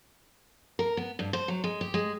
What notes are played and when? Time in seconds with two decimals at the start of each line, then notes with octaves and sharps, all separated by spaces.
0.79 A#4
0.97 B3
1.19 G2
1.33 C5
1.48 F#3
1.64 G#3
1.81 G4
1.94 G#3